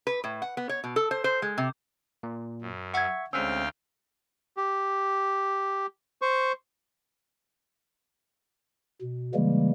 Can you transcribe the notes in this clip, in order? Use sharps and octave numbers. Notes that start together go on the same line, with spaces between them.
B4
A2
F#5
B3
C#5
B2
A4
C5
C5
G#3
C3
A#2
F#2
E5 F#5 C#6 G#6
D2 G#3 C4 C#4 F5 G5 E6
G4
C5 C#6
B2
C#3 E3 G3 G#3 A#3